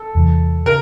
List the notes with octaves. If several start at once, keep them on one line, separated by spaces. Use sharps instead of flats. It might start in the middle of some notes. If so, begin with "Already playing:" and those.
Already playing: A4
E2 C3 E3
C#3 A#4